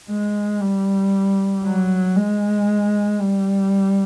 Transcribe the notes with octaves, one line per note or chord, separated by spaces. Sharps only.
G#3
G3
F#3
G#3
G3